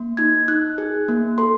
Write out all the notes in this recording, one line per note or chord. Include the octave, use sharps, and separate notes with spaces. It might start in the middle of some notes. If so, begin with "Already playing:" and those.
Already playing: A#3
D#4 G#6
D#4 F#6
G#4
A#3
A4 C6